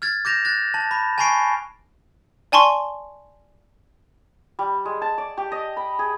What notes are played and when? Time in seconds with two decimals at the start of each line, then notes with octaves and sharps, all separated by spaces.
0.02 F6 G#6 A6
0.25 D6 G6 A#6 E7 F7
0.45 F#6 A6
0.74 A5
0.91 B5
1.18 G#5 A5 B5 C#6 C7 D7
2.52 D5 G#5 A5 C6 C#6
4.59 G3
4.85 G#3
5.02 A5
5.18 D5
5.38 G4
5.52 D#5
5.77 B5
5.99 G#4